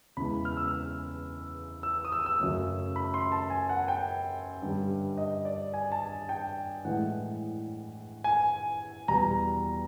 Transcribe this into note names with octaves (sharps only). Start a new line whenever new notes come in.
E2 C#3 E3 G#3 B5
F6
E6
F6
E6
D#6
E6
E6
F#2 C#3 F#3 A3
B5
C6
A5
G#5
F#5
G5
G2 D3 G3
D#5
D5
G#5
A5
G5
A2 E3 G#3 F#5
G#5
E2 B2 G3 A#5